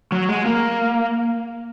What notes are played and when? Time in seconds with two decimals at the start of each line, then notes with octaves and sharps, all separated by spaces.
0.12 F#3
0.29 G#3
0.46 A#3